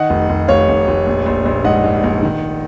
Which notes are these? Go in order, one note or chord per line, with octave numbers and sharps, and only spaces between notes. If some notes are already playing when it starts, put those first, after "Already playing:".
Already playing: D#3 D#5 F#5
F1
F1
F1 C#5 F5
F1
F1
A#1
A#1
A#1
G#2 D#5 F#5
G#2
A#1
D#3